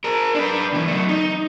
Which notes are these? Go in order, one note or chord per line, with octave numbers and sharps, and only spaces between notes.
G#4 A#4
D4 B4
C#2 E3
F#3 A3
D#4